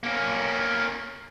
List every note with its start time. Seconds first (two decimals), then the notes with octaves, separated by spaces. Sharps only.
0.04 A#3 C#4